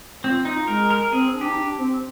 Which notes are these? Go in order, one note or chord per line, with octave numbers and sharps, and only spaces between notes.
C4 F4
D#4
G#3 A#4
A#4
C4 G#4
D4
G4
D#4
D4
C4